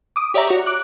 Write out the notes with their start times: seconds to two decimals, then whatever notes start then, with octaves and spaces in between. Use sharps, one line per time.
0.16 D6 D#6
0.34 G4 C#5 D5 E5 A#5
0.47 F#4 C#5
0.66 D6 F#6